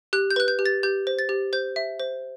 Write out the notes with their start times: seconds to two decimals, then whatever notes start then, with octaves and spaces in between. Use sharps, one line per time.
0.13 G4 F#6
0.30 G6
0.36 B4 F#6
0.48 G6
0.59 G4
0.66 A6
0.83 G4 G6
1.07 C5
1.19 A6
1.29 G4
1.53 C5 G6
1.76 E5
2.00 C5